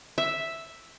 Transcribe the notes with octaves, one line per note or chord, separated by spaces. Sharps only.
E5